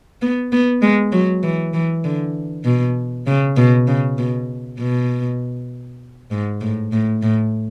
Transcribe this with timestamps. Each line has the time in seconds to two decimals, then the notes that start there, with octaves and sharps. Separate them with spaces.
0.22 B3
0.52 B3
0.82 G#3
1.12 F#3
1.43 E3
1.74 E3
2.04 D3
2.64 B2
3.27 C#3
3.57 B2
3.87 C#3
4.18 B2
4.79 B2
6.31 G#2
6.61 A2
6.92 A2
7.22 A2